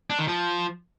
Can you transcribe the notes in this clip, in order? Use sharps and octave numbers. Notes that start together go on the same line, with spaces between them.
D4
D#3
F3